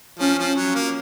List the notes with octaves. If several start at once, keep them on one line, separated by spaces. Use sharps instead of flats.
F3 C#4
F3
F#3
A#3